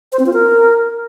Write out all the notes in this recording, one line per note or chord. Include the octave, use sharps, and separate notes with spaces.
C5
C4
F4
A#4